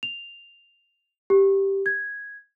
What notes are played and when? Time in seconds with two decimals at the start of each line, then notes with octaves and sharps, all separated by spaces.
0.03 F7
1.30 G4
1.86 G#6